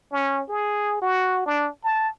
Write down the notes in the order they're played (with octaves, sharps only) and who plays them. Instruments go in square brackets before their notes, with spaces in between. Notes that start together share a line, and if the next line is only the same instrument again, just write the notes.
[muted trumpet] C#4
G#4
F#4
D4
A5